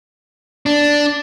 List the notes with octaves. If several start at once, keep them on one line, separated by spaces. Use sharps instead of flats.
D4